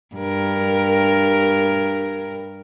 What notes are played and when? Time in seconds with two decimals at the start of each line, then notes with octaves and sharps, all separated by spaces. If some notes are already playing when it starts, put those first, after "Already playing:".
0.16 G2 A#4